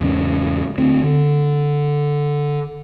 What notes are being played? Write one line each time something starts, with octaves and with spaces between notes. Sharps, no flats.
E2 G#2 C#3 C#4
D2 C4
D3